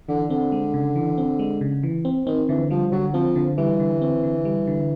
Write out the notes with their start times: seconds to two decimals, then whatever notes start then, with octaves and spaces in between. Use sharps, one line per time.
0.08 D3 E3
0.30 D3 C4
0.52 G#3
0.74 C#3
0.96 E3
1.18 C4
1.39 G#3
1.61 C#3
1.83 E3
2.05 C4
2.27 D#3 C4
2.49 D3 E3
2.70 F3 G3
2.92 D3 F#3
3.14 F3 C4
3.36 D3
3.58 E3 G3
3.80 D3
4.01 C4
4.23 D3
4.45 G3
4.67 D3